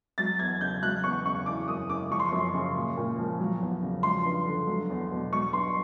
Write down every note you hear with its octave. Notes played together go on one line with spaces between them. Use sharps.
F#3 A6
E2 G#6
C#3 G6
F#3 F#6
E2 C#6
C#3 C#6
E3 D6
F#2 D#6
C#3 D6
F3 C#6
C6
F#2 C#6
C#3
A#2
A#2
F3
F#3
E2
C#3
F3 C6
G2
D3
F#3
E2
B2
F#3 C#6
G2 C6